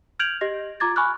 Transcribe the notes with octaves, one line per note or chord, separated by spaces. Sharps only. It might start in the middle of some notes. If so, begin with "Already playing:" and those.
F6 G6 G#6 D7 F7 F#7
G4 D#5 A#6
F4 A#5 D6 G#6 A6
G#5 B5 C#6 D6 F6 F#6